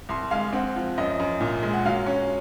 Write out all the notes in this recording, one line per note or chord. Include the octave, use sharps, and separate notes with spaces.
C2 C6
G#3 F5
C4 F#5
F3
F#2 D#5
F#2
A#2
G#3
F#5
F#3 F5
C#4